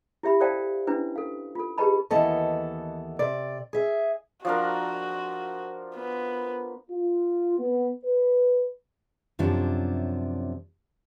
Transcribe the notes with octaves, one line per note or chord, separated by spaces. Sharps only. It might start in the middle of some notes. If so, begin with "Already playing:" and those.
E4 G4 E5 B5
A4 C5 D5 F5 G5 A5
C#4 D4 E4 B4
A4 F5
F4 A4
G4 G#4 B4 D#5 A5 B5
D#2 E3 B3 A4 D#5 A5
C3 D5
G#4 E5
F3 D4 F#4 A#4
B3
F4
B3
B4
F#2 C3 F3 C#4 D4